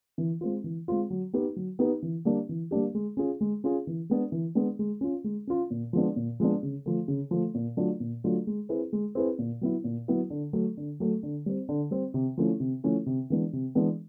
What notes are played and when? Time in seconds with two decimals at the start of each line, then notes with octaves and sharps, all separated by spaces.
0.18 E3
0.41 G#3 C4 F4
0.64 E3
0.88 G#3 C4 F4
1.10 F#3
1.33 B3 D#4 G4 B4
1.56 F#3
1.79 B3 D#4 G4 B4
2.02 E3
2.25 G3 A#3 D4 G4
2.49 E3
2.71 G3 A#3 D4 G4
2.95 G#3
3.17 C#4 F4 G#4
3.41 G#3
3.64 C#4 F4 G#4
3.87 E3
4.10 G#3 B3 D4
4.32 E3
4.55 G#3 B3 D4
4.79 G#3
5.01 C#4 F4
5.24 G#3
5.47 C#4 F4
5.70 A#2
5.93 F3 G#3 B3 D4
6.16 A#2
6.40 F3 G#3 B3 D4
6.63 C#3
6.86 F3 A3
7.08 C#3
7.31 F3 A3
7.54 A#2
7.77 F#3 A3 D4 F4
8.00 A#2
8.24 F#3 A3 D4 F4
8.47 G#3
8.69 C4 E4 G#4 B4
8.93 G#3
9.15 C4 E4 G#4 B4
9.39 A#2
9.61 F#3 B3 E4
9.84 A#2
10.08 F#3 B3 E4
10.30 D3
10.53 F#3 A3
10.77 D3
11.00 F#3 A3
11.23 D3
11.46 G3 C4
11.69 D3
11.91 G3 C4
12.14 C3
12.38 F3 A3 C#4 E4
12.60 C3
12.84 F3 A3 C#4 E4
13.06 C3
13.30 E3 G#3 B3 D4
13.53 C3
13.75 E3 G#3 B3 D4